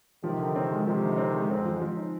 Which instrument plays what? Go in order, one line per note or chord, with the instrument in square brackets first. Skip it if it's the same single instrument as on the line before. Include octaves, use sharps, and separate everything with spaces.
[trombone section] C3 D#3 [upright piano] F3
[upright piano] D3
C4
G#3
[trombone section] C3 D#3 [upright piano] F3
[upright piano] D3
C4
G#3
[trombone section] F2 G#2 [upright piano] C4
[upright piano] F3
F3
D#4